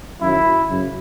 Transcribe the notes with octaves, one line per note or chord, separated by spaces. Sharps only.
F#2 D#3 F#3 E4
F#2 C#3